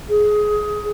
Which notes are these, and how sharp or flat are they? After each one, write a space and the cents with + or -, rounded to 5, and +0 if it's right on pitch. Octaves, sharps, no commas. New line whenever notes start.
G#4 +15